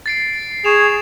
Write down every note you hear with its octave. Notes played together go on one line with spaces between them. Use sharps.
A6 C7 D7
G#4 C#6 E7 F7